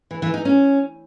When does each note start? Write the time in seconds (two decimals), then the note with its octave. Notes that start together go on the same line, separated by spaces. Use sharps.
0.11 E3
0.22 E3
0.34 D#4
0.45 C#4